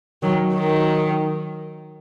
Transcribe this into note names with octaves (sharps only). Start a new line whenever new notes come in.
D#3 F#3
D#3 F#3